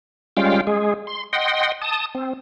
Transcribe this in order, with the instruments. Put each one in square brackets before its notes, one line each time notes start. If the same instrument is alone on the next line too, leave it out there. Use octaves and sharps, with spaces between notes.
[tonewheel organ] G3 G#3 C#4 F4 F5 G5
G#3 G#4
C6
D#5 F#5 G5 C6
A5 D#6
C4